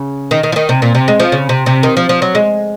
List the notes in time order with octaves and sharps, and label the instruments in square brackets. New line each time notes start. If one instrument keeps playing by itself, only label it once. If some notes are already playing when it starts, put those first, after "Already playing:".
Already playing: [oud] C#3
D#3
D#3
F3
D#3
C3
A#2
C3
G#3
F3
C#3
C3
C3
D#3
F3
F3
F#3
G#3